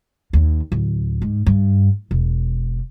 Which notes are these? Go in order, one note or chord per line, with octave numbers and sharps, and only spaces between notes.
D#2
D1
G#2
G2
E1